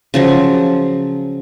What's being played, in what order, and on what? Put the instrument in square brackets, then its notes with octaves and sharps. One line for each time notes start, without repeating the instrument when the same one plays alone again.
[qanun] C#3 F3 F#3